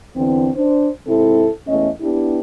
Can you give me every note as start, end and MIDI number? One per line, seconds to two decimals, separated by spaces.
0.16 0.49 40
0.16 0.49 50
0.16 0.49 52
0.16 0.49 60
0.56 0.89 62
0.56 0.89 72
1.07 1.47 44
1.07 1.47 48
1.07 1.47 60
1.07 1.47 64
1.07 1.47 69
1.68 1.89 40
1.68 1.89 57
1.68 1.89 61
1.68 1.89 75
2.01 2.40 59
2.01 2.40 62
2.01 2.40 64
2.01 2.40 67